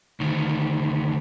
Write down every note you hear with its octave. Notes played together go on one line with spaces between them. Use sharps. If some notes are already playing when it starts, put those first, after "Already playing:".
D2 D#3